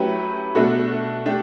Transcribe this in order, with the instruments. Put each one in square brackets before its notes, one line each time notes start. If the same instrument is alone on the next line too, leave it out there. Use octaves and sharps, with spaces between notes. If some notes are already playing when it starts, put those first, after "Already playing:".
Already playing: [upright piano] F#3 A3 C#4 E4 G4 B4
B2 A3 D4 F#4 A4
A3 D4 G4